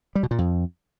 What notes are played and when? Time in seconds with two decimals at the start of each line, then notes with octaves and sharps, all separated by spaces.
0.15 G3
0.23 B2
0.31 A#2
0.39 F2